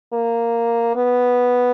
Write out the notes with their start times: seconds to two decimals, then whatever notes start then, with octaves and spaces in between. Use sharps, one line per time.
0.13 A#3
0.96 B3